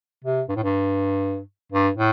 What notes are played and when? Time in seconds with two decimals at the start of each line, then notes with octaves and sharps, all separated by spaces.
0.24 C3
0.49 G2
0.56 A2
0.63 G2
1.72 G2
1.97 A2